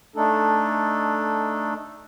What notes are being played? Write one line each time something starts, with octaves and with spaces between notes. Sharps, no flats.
A3 D4 D#4 A4